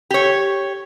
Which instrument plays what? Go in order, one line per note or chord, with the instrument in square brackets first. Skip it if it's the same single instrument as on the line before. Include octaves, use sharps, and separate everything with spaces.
[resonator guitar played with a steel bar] G4 C#5